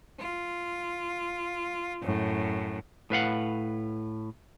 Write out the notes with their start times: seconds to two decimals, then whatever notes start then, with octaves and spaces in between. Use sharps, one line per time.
0.20 F4
2.02 F#2 A2
3.10 A2 B4 F5 F#5